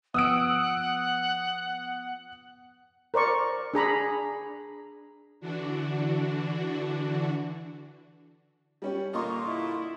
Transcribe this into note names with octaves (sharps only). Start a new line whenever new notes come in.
F3 B3 F#5 D#6 E6 D7
A#4 C5 D5 C#6
D4 G#4 A#5 B5
D3 E3 D4 F#4
G3 C#4 G4
A#2 D3 A#3 F4 D#5 C6 C#6
E4